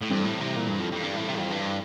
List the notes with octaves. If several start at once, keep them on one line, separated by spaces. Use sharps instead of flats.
A2
G2 E3 G3 C4 E4 A4
A2
C3
A#2
G2
F2
F2
G2
A2
C3
F2
G2